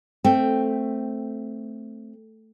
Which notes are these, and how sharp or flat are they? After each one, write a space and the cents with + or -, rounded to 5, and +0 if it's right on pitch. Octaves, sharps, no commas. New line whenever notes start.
A3 +5 C4 +0 G5 +0